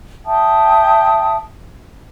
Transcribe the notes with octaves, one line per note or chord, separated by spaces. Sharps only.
E5 G5 A5 D#6